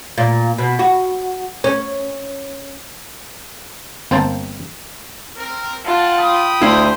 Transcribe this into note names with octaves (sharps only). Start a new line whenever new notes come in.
A#2
B2
F#4
C#4
G1 A#3 C4 C5 G5 A5
C4 A#4
F4 F#5 G5 A5
G5 B5 D#6
D2 E4 C5 F5